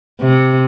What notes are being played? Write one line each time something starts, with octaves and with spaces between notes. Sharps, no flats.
C3